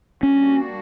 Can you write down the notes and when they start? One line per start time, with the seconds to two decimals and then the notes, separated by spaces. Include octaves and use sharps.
0.22 G3 A#3 C#4 D4 F#4